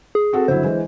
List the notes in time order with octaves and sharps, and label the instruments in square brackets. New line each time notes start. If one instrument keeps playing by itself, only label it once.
[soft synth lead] G#4
[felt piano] C4 F#4 A4
[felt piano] G1 F#3 E4 [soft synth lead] C5
[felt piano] E3 G#3